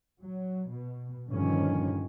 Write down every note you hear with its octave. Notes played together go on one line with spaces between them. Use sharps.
F#3
B2
G2 A#2 D3 D#3 F3 C#4